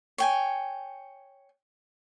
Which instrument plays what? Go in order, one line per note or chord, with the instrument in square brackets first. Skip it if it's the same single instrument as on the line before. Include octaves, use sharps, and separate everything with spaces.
[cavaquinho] C#5 G5 G#5